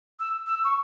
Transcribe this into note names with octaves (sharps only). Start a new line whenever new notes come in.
E6
E6
C#6